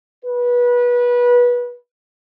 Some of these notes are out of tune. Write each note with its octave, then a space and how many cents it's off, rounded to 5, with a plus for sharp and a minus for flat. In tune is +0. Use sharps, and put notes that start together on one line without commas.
B4 -25